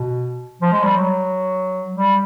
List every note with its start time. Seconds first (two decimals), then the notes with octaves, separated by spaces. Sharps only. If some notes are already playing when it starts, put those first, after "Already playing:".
Already playing: B2
0.61 F3
0.72 G#3
0.84 G3
0.95 F#3
1.95 G3